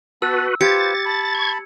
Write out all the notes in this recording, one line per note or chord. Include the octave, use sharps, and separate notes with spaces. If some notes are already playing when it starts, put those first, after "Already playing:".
B3 F#4 B4 A5 E6
F4 G4 B4 C5 G#6 A6 C#7
A5 B5
C#6 G#6